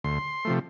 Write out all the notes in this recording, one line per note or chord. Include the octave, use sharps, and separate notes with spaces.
D2 C6
C3 F3 A3